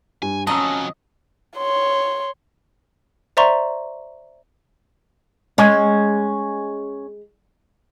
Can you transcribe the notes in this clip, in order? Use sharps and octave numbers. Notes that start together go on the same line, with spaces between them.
G2 G#5
F2 F#3 C#4 D#5 A5 A#5 E6
C#5 C6
C5 D5 E5 A#5 C6 C#6
G#3 C#4